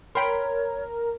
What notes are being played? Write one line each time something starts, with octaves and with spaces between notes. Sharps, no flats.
A#4 C#5 G5 B5 C6